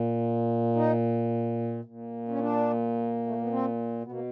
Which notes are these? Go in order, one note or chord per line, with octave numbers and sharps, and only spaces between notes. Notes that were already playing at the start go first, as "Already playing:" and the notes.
Already playing: A#2
D#4
A#2
C#4
D4
A3
A#3
B3
C4
B2 B3
A#3